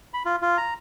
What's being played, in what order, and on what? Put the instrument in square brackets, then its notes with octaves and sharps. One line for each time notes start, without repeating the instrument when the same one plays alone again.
[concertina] B5
F4
F4
A#5